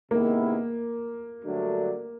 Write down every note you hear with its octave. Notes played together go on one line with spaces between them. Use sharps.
C3 D#3 G#3 A#3 B3 E4
G2 D3 F#3 A3 D4